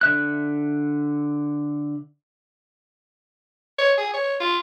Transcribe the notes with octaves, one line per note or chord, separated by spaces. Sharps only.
D3 E5 F#6
C#5
G#4
C#5
F4